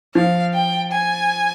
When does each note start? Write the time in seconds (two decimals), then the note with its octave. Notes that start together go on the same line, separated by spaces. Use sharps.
0.15 F3 F5
0.54 G5
0.92 G#5